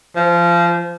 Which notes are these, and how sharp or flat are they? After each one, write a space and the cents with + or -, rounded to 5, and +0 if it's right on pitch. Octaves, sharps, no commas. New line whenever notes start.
F3 -25